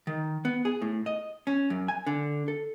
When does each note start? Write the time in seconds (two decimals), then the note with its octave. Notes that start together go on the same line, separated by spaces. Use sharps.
0.07 D#3
0.45 B3
0.65 G#4
0.82 A2
1.06 D#5
1.47 C#4
1.70 F#2
1.88 G#5
2.07 D3
2.48 A4